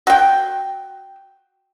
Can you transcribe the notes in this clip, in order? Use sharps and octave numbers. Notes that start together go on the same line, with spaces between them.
F#4 G5